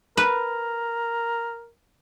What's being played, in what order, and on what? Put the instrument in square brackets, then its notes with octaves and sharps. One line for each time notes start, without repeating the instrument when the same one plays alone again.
[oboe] A#4 [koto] B4